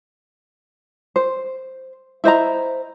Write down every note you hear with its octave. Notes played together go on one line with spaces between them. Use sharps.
C5
E4 C5 D#5 A#5